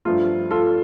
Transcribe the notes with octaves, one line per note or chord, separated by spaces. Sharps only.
G2 F3 A3 F4
F4 A4